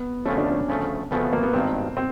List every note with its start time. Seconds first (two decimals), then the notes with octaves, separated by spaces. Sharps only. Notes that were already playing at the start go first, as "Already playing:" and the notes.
Already playing: B3
0.26 D2 C#3 F3 A3 C#4
0.38 D4
0.51 C#4
0.68 D2 C#3 F3 A3
1.11 D2 C#3 F3 A3 B3
1.33 A#3
1.43 B3
1.54 G#1 G2 D#3 C4
1.97 C4